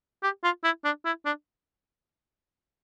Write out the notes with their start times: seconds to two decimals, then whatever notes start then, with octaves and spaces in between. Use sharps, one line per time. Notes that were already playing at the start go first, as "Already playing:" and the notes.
0.23 G4
0.44 F4
0.64 E4
0.84 D4
1.05 E4
1.25 D4